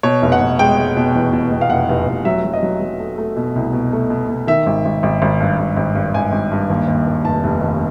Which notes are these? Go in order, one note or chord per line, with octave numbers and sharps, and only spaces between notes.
B2 C#5
F1
F#5
F1
G#3 G5
G#3
B2
E2
B2
B2
F5
F1 F#5
F1
F1
F#3 E5
F#3
D#5
F#3
F#3
A3
A3
B2
C2
B2
A3
B2
B2
D#3 E5
G#1
G#1
G#1
G#1
G2
G#1
G#1
G2
G#1 G#5
G#1
G2
D#2
D#2
D#2
F1 A5
F1
D#2